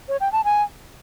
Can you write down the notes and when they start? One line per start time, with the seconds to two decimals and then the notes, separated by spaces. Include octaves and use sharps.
0.08 C#5
0.20 G5
0.32 A5
0.44 G#5